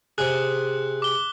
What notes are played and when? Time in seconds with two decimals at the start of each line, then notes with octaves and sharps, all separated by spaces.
0.18 C3 G#4 F#6
1.02 D6 G7